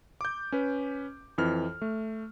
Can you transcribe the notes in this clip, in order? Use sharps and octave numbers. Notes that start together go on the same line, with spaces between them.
D6 G6
C#4 B4
F2 E3 F6
A3